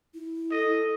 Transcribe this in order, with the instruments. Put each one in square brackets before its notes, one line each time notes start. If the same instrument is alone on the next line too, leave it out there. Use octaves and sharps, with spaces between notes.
[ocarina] E4
[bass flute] A4 [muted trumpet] D#5